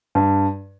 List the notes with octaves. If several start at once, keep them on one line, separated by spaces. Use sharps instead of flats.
G2